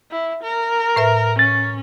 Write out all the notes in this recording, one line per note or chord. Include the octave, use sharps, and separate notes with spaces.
E4
A#4
A2 B4 E5
C#4 A6